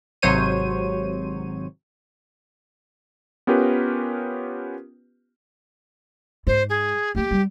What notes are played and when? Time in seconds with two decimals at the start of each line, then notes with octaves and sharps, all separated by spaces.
0.22 G#1 C3 F#3 C5 C#5 D#7
3.47 B3 C#4 F4 G4 A#4 B4
6.47 G#2 G#3 C5
6.69 G#4
7.15 A3 A#3 G4
7.31 G3